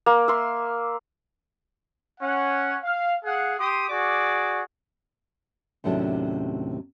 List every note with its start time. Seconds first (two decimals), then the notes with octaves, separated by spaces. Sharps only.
0.06 A#3
0.28 E5 C6
2.20 C#4 F#5
2.81 F5
3.24 G#4 F5 F#5
3.59 G4 C6 D#6
3.88 F#4 G#4 D5 D6
5.84 D#2 A2 C3 F#3 C#4 D4